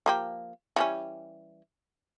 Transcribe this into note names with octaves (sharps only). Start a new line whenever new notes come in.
F3 A#3 G4
E3 G3 C#4